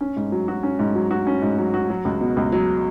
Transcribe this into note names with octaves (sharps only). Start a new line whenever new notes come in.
C#4
G#2
F#3
F#4
C#4
G#2
F#3
F#4
C#4
G#2
F#3
F#4
F#3
C#2
B2
C#2
F#3